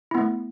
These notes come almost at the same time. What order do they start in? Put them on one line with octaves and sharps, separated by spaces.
E4 B3 A3